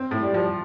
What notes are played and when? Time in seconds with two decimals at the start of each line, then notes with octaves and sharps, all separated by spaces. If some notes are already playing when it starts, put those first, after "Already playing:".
Already playing: C4
0.11 A2
0.22 G3
0.34 F3